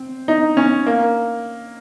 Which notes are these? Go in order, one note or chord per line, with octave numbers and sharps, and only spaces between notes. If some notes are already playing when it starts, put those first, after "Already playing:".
Already playing: C4
D#4
C#4
A#3